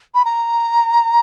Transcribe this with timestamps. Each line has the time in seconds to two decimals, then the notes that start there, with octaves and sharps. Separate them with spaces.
0.14 B5
0.25 A#5